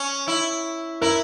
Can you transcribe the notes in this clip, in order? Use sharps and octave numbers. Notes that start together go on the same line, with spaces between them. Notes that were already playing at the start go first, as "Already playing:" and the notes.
Already playing: C#4
E4
E4 A#4